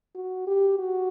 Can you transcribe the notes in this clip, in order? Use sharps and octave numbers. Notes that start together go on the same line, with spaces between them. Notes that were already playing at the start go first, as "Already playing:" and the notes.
F#4
G4
F#4